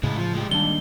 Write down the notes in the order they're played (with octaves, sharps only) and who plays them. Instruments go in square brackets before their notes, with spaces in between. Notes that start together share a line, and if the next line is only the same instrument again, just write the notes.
[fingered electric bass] A2 C#3 [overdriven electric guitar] G#3 E4
[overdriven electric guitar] F3
G#3 G4
[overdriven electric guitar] D#2 [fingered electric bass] G3 G#3 D4 [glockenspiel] G7